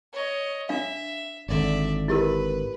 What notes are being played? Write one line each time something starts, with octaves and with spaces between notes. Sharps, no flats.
C#5 D#5
D4 E5 F5
G#1 D3 D5 E5
E4 G4 A#4 B4